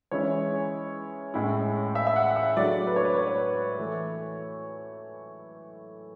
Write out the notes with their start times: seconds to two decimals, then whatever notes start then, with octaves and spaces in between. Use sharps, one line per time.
0.11 E3 G#3 C#4 E4 C#5
1.34 A2 G#3 C#4 E4
1.95 E5
2.07 E5
2.16 F#5
2.36 E5
2.57 F#3 A3 D4 D5
2.87 B4
2.96 C#5
3.05 B4
3.18 C#5
3.79 E3 A3 E4